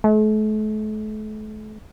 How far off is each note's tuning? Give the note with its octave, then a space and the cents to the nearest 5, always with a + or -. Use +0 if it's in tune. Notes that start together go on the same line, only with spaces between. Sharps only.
A3 -40